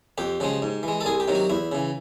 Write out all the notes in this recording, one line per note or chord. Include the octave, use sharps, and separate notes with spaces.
F2 G4
C#3 F3 G#3
G#2
E3 G#3
A4
C2 G#4
G4
C3 D#3 F#3
F#4
E2 E4
C#3 E3